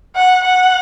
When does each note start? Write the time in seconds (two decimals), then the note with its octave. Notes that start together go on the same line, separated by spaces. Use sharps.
0.16 F#5
0.44 F#5